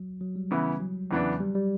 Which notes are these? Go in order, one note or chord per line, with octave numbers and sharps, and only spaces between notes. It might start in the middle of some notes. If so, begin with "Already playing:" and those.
Already playing: F#3
F#3
G3
C#3 E3 B3 E4
F#3
E2 C#3 E3 B3 D4
G3
G3